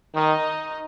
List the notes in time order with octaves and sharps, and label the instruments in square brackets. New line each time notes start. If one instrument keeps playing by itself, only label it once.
[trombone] D#3 [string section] D#4 D#5